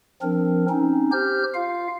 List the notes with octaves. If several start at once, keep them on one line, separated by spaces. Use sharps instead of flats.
F3 C4 D4 A#4
C4 C#4 D#4
G4 C5 F6 G6
F4 F5